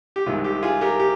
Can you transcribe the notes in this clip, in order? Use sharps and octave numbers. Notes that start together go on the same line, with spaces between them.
G4
C2 C3 D#3 G#3 F4
G4
F4 G#4
G4 A#4
G4